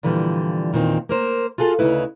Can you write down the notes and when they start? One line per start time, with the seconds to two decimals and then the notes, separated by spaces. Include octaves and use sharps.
0.03 A#2 D3 E3 F3 G3
0.72 E2 A#2 D#3 C4
1.09 A#3 A#4 C5
1.58 F4 F#4 G#4 A4 F5
1.79 D2 C#3 F#3 D#4 E4 B4